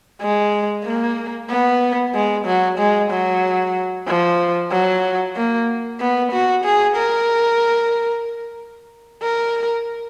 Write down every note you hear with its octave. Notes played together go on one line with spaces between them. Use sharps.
G#3
A#3
B3
G#3
F#3
G#3
F#3
F3
F#3
A#3
B3
F#4
G#4
A#4
A#4